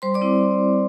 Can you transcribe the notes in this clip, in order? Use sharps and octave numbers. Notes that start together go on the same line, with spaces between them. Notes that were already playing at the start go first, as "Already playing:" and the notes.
G3 C5 C6
D5 D6
C4 E4